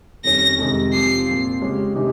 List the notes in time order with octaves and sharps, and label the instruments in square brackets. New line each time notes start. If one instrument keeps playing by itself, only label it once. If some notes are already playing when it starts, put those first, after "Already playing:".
[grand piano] F2 D#3 G3 C#4 [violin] A#6
[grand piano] F2 C3 D#3 G#3 D#4
[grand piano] F3 C4 G4 [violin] C7
[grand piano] A#2 F3 C4 F4
C#3 G#3 C#4 G4
C3 D#3 G#3 D#4 G4